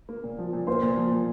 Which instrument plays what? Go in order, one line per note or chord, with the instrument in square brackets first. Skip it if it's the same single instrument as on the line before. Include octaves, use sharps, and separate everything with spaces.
[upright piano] A#3
A#2
F3
A#2
[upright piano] A#3 [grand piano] C5 C6
[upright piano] A#2
F3
A#2